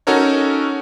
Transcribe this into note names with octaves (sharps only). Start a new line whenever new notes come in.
C#4 D#4 F#4 A4 A#4 C#5